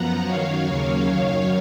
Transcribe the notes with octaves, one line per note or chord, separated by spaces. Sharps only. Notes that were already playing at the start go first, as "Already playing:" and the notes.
Already playing: F#2 F3 B3 F#5 A#5
F#2 D#3 F#3 C#5 F5
D#2 C#3 F#3 A#3
F#2 D#3 F#3